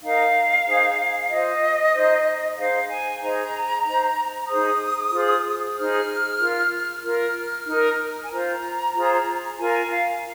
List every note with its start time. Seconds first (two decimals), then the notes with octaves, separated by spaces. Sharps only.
0.02 D#4 A#4 F5
0.65 D#4 G#4 C5
1.29 F4 C5 D#5
1.93 D#4 C5
2.57 D#4 G#4 C5 F5
2.89 G#5
3.20 D#4 G#4 C5 A#5
3.84 D#4 C5
4.48 D#4 G#4 C5 D#6
5.12 F4 G#4 C5
5.76 D#4 G#4 C5 F6
6.39 F4 A#4
7.03 F4 A#4 F6
7.67 D#4 A#4
8.24 G#5
8.31 F4 C5 A#5
8.95 F4 G#4 C5
9.59 F4 A#4 G#5
9.91 F5